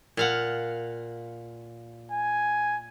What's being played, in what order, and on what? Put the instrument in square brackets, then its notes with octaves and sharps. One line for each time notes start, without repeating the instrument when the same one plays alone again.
[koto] A#2 F5 F#5
[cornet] G#5